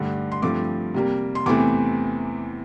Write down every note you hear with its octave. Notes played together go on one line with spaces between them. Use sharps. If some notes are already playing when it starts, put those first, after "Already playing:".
Already playing: G2 D3 A3
C6
G2 F3 A3 C4 D6
C3 G3 A#3
C6
E2 C3 E3 A3 C4 D6